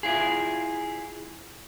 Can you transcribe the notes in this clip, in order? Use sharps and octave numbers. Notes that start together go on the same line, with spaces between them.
E4 F4 G#4